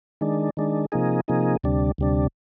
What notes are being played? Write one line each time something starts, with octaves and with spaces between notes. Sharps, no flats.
D#3 G#3 D4
D#3 G#3 D4
C3 F3 A#3 D#4 G#4
C3 F3 A#3 D#4 G#4
D2 C3 G3 D4
D2 C3 G3 D4